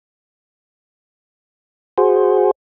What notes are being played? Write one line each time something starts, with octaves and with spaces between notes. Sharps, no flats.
F#4 G#4 C5